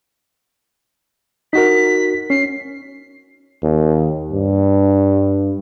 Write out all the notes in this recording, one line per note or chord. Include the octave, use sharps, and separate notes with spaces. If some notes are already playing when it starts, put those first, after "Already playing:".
D#4 F#4 A#4 B6
C#4 C7
D#2
G2